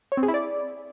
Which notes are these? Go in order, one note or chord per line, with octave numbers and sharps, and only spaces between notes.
C#5
C4
G#4
E4
D5